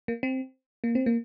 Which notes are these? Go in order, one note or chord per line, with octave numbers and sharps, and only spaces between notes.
A#3
C4
A#3
C4
A#3